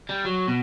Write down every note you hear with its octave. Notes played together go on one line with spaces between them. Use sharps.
G3
F#3
B2